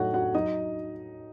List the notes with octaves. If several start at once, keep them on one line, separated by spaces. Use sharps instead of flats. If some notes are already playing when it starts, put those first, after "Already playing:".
Already playing: A2 F#3 A3 D#4 F#4 C#5 F#5
F#4 F#5
F#3 D#4 D#5